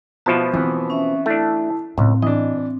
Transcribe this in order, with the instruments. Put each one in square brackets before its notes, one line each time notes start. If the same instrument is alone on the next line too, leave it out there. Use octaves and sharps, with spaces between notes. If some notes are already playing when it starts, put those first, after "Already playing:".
[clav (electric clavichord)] B2 F3 A5 [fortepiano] B3 E4 F4
[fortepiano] E3 B3 [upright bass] C4
[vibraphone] C#4 E5
[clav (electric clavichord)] A3 D4 [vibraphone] E4 A5
[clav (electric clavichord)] C#2 [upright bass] A2 [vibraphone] C4
[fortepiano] E3 D4 [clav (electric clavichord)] D#5